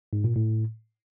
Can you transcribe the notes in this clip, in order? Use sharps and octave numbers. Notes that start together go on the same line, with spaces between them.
G#2
A#2
A2